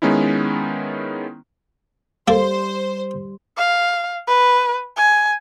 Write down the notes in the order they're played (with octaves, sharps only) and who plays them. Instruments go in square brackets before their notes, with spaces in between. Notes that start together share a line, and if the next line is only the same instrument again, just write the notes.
[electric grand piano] D#3 G#3 B3 C#4 D#4 E4
[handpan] G3 [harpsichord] A#3 A4 [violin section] C5
[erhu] F5
B4
G#5